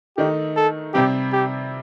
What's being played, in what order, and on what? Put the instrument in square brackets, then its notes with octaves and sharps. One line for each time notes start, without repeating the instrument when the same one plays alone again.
[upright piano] D#3 A3 D#4 [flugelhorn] G4
[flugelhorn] A4
[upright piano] C3 G3 C4 [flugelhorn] G4
[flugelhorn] G4